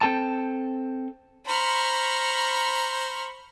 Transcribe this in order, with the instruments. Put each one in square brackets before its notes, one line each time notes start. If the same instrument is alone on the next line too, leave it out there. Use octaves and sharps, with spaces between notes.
[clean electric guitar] C4 A4 G5 A5
[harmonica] C5 A#5 [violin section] B5 C#6 F6